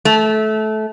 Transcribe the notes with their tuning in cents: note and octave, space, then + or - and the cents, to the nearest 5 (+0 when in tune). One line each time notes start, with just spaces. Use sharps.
A3 -20